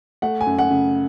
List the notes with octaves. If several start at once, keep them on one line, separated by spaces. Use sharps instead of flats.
A3 F#5
G#5
F#2
F#5
C#3